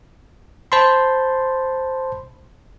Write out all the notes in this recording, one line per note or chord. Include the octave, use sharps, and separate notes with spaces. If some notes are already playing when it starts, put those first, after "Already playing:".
C5 A5 B5 C6